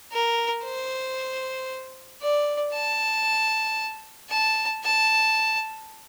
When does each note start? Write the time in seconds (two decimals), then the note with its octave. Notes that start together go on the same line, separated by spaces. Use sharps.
0.12 A#4
0.64 C5
2.22 D5
2.74 A5
4.30 A5
4.84 A5